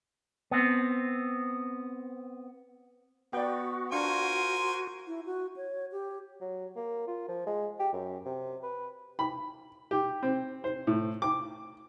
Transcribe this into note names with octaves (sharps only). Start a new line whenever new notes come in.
B3 C4
B3 F#4 D5 G5
D4 F4 A#4 C5 F5 G#5 C#6
E4
F#4
C#5
G4
F#3
A#3
F4
F3
G#3
G4
F#2
C3
B4
B5
G4
C4
C5
A2
D6